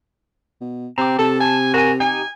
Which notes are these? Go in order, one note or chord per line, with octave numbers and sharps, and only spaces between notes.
B2
C3 C4 A#5 D6
C3 A4 A5
G#5
F#4 A#4 G#5
D#4 G4 G#5